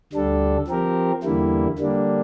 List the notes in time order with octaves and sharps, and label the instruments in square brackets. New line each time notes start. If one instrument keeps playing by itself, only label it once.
[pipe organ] D2 D3 G3 D4 A4
F3 C4 G4 A#4
E2 D3 G3 A#3 E4
D3 G3 A#3 D4